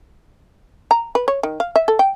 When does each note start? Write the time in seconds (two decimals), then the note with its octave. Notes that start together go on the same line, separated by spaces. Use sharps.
0.91 A#5
1.15 B4
1.28 C#5
1.43 D#3
1.60 F5
1.76 E5
1.88 A4
1.99 G5